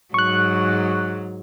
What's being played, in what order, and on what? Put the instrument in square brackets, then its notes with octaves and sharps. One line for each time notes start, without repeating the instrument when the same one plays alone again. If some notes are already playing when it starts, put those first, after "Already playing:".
[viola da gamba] G#2 F#3 [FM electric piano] C#6 F#6